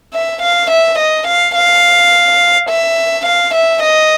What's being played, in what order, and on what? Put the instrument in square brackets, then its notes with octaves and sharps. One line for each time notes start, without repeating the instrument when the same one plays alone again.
[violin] E5
F5
E5
D#5
F5
F5
E5
F5
E5
D#5